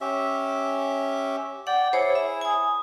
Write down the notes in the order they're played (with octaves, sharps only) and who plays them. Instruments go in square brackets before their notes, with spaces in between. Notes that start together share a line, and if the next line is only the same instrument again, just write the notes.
[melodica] C#4 G4 E5
[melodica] D5 G5 [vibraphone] F#5
[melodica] E4 G#4 [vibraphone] C5 C#5
[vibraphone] E5
G#5 D#6